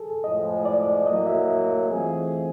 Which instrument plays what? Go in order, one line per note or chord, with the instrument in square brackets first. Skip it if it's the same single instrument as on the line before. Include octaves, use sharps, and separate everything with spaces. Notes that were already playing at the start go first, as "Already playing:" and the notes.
Already playing: [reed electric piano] G#4 A4
[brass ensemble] A2 F3 G#3 [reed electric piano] D#5
[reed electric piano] D5
[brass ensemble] A2 F#3 A#3 [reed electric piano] D#5
[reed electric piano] E5
[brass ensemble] E3 A3 C4 F4 G#4